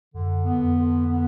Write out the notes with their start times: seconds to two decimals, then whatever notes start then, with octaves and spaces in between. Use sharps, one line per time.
0.14 F#2 D3
0.45 B3
0.60 F2
0.75 D3
1.06 B3